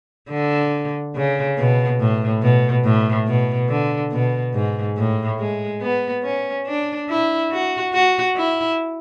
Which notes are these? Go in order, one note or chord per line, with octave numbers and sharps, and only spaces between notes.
D3
C#3
B2
A2
B2
A2
B2
D3
B2
G#2
A2
G#3
B3
C#4
D4
E4
F#4
F#4
E4